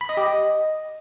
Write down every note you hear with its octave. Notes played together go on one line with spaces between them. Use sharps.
B5
D#5
G4
D#5